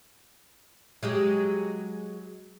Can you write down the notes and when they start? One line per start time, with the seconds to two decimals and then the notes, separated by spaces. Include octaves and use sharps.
1.03 F#3 G#3 G4